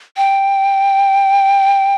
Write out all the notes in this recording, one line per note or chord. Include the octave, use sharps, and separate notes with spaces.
G5